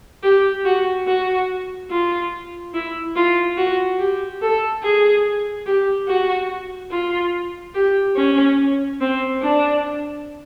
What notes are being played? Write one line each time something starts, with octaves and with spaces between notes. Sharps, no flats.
G4
F#4
F#4
F4
E4
F4
F#4
G4
A4
G#4
G4
F#4
F4
G4
C#4
C4
D4